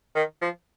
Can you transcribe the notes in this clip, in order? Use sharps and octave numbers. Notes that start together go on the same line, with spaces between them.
D#3
F3